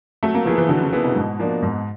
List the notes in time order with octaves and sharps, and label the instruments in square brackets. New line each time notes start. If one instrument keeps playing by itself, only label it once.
[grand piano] F#3 [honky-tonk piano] A3
[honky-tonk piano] A#3
[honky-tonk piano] F3 [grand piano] B3 E4 G#4
[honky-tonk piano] E3
[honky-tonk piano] D3 [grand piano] F#3
[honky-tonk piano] C#3
[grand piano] B3 E4 G#4
[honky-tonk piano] B2
[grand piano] G#2
F3 A#3 D4
G#2